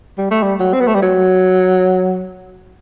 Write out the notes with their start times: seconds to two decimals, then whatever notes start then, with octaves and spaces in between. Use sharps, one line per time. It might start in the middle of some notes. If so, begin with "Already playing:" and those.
0.18 G3
0.31 A3
0.43 G3
0.60 F#3
0.73 C4
0.81 B3
0.87 A3
0.95 G3
1.02 F#3